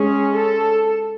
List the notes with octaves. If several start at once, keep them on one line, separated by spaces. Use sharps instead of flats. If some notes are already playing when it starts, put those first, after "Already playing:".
Already playing: G#3 C#4 G#4
A4